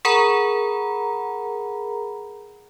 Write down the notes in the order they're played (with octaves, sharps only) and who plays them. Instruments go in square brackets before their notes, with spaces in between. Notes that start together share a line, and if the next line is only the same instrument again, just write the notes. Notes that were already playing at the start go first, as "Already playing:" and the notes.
[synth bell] G#4 A#4 F#5 A#5 B5